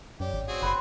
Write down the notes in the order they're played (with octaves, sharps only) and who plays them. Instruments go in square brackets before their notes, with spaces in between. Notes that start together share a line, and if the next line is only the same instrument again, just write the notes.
[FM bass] F#2 [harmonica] G4 [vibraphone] C#5 D5
[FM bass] G#1
[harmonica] C4 F#4 G#4
[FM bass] F#1 [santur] B4 C6